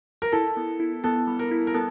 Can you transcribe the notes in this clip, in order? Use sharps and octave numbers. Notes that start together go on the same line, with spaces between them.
A#4
E4 A4
B3
E4
B3 A4
G3
A#4
E4
A#4
B3 A4